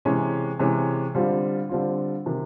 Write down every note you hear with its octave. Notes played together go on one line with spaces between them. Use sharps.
C3 E3 G#3 C#4
C3 E3 G#3 C#4
D3 G3 C4 F4
D3 G3 C4 F4
C3 D#3